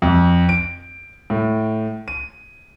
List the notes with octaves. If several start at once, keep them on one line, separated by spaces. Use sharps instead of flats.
F2
D7
A2
D#7